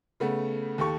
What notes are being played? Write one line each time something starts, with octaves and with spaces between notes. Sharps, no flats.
C#3 A3 B3
D#2 G4 A4 C#6